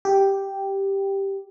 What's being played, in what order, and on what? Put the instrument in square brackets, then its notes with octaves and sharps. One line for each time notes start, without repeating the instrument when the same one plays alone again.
[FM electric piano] G4